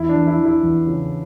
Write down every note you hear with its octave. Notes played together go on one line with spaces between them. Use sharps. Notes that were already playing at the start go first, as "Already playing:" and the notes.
Already playing: E2 E4
D4
E3
E4
E3
E4
E2
C#3